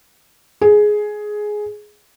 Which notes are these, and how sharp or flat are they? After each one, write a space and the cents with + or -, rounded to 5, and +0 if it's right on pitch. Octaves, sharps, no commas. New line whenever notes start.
G#4 +10